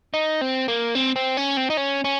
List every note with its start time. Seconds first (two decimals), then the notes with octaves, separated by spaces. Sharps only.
0.14 D#4
0.41 C4
0.68 A#3
0.95 C4
1.16 C4
1.37 C#4
1.57 C4
1.70 D#4
1.77 C#4
2.04 C#4